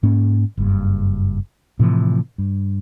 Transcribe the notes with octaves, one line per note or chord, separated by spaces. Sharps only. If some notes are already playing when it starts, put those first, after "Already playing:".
G#2 A#3 C#4
F#1 G2
A2 C3 E3 F3
G2